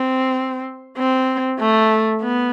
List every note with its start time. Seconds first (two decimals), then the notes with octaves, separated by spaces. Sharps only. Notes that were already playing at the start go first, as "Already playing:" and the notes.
Already playing: C4
0.98 C4
1.60 A3
2.22 B3